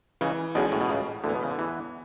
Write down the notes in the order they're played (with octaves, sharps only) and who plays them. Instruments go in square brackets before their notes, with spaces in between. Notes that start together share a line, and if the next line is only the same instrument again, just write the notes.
[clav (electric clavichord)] C#2 C#3 [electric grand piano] E3
[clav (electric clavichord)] B1 B2 [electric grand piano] G#3 C#4 G#4 D5
[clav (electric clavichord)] A2
B2
[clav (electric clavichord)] C#2 C#3 [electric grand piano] A2
[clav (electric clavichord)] D2 D3 [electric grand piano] E3 B3
[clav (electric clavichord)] B2
C#3
D3
[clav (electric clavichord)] E2 E3 [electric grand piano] B3